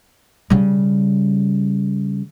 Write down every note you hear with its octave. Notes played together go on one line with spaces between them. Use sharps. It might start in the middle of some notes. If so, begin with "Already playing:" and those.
C#3 G3